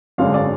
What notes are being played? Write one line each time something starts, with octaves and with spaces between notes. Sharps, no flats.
G#1 F#2 D3 G#3 F5
D5